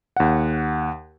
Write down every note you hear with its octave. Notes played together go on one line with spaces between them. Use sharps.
D#2 F#5